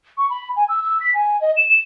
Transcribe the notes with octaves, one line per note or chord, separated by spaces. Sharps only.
C#6
B5
G#5
E6
E6
B6
G#5
D#5
E7
E7